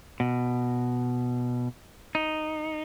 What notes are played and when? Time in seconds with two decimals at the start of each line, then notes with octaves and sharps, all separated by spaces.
0.20 B2
2.15 D#4